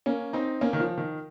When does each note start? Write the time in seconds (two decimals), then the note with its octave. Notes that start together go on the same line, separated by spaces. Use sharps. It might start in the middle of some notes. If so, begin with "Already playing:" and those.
0.06 A#3 C#4
0.33 C4 D#4
0.61 A#3 C#4
0.73 D#3
0.80 F3
0.97 D#3